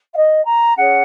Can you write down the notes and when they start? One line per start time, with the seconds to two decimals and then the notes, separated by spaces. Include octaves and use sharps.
0.13 F5
0.16 D#5
0.46 A#5
0.76 C#4 G#4 C#5 F#5